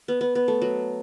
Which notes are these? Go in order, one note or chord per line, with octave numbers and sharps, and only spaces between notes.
B3
B3
B3
A3
F#3